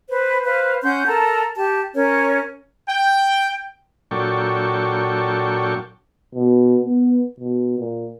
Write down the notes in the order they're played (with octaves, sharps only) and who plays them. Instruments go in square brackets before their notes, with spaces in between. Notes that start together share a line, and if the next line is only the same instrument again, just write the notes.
[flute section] B4 C5
B4 C5 F5
C#4 F#5 C6 G6
A4 A#4 A5 A#5
G4 A5
C#4 A#4 C#5
[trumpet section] G5
[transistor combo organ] A#2 F#3 D4 A4 G5 C#6
[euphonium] B2
B3
B2
A#2